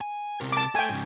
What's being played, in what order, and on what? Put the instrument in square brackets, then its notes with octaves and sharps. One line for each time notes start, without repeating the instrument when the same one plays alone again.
[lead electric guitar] G#5
C3 A#4
[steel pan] A5 D6
[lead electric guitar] A4 E5 [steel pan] G5 G#5
[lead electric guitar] G#2 C#3